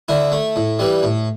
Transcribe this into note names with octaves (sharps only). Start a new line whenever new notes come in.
D3 E4
A3
A2
E3 G3
A2